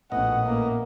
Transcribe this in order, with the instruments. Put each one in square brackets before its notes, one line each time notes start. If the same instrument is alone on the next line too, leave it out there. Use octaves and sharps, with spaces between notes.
[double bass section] A#1 C#4 [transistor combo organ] A2 B3 D#5 [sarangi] F#5
[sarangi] A#3